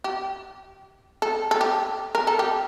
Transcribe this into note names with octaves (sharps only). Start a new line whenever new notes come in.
G4
A4
A4
G4
A#4
A4
G4